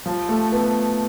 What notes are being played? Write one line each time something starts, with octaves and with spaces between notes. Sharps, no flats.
F3
A3
B3